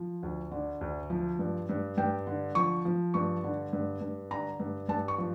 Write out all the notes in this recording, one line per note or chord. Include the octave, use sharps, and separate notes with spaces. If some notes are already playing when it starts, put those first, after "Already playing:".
Already playing: F3
D2
D3
D2
F3
G2
G2
G2 G5
D3
F3 C#6
F3
G2 C#6
D3
G2
G2
D3 A#5
G2
G2 A5
C#6
F3